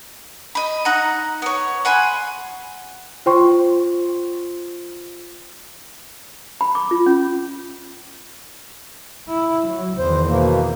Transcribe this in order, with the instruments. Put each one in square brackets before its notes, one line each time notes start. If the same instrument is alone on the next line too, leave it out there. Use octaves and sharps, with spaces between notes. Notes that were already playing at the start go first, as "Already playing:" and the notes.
[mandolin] D#5 B5
D#4 F#5 A#5
B3 C#5
F#5 G#5 B5 C6
[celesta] F4 C5 G5 C6 C#6
[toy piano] B5
D6
F4
C#4
[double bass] E4
F#3
[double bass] E2 D#3 [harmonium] C5
[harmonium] B2 A#3